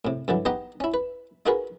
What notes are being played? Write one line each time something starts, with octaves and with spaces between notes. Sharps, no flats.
A2 C3
G2 D3 E3 F#3
B3 D#4 G4 D#5 F#5 A#5
C#4 E4
B4
D#4 F4 F#4 G#4 A#4 B4